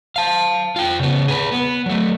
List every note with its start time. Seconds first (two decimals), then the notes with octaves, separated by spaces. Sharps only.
0.16 F5 A5
0.76 F4 G5
0.99 C#3 B3
1.28 G#4 B4
1.52 B3
1.86 F#3 A3